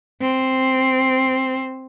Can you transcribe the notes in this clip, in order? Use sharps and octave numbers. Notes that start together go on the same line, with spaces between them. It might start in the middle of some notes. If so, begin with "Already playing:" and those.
C4